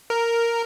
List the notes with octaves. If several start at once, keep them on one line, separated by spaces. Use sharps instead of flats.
A#4